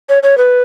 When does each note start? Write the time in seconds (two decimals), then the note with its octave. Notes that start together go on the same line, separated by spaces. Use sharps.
0.09 C#5
0.23 C#5
0.38 B4